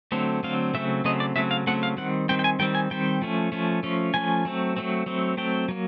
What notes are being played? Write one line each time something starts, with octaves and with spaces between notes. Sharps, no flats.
D3 F#3 A3 C4
D3 F#3 A3 C4 F5
C#3 F#3 A3 C4 E5
C#3 F#3 A3 C4 D#5
D5
C#3 F#3 A3 C4 E5
F5
C#3 F#3 A3 C4 F#5
F5
D#3 G3 C4 F#5
D#3 G3 C4 G5
G5
G#5
D#3 G3 C4 G5
G#5
D#3 G3 C4 G5
F3 A3 C#4
F3 A3 C#4
F3 A3 C#4
F3 A3 C#4 G#5
F#3 A3 C4
F#3 A3 C4
F#3 A3 C4
F#3 A3 C4 G5
F#3 A#3